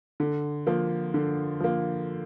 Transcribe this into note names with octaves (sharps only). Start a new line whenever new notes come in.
D3
F3 A#3
D3
F3 A#3